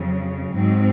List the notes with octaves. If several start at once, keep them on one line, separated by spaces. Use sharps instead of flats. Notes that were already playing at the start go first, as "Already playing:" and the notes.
Already playing: F2 C#3 F#3
G#2 F#3 C4